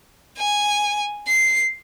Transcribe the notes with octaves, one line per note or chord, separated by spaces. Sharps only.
G#5
C7